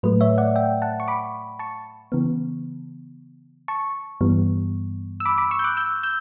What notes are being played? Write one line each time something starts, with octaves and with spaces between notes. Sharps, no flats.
A2 F#3 A3 B4
C#5 E5
D5 F#5
E5 G5
F#5 A5
C#6
B5 D6
A5 C#6
C#3 E3 B3
A5 C#6
G2 E3 G3 B3
E6
B5 D6
B5 D6
C#6 E6
G6
D6 F#6
E6 G6
E6 G6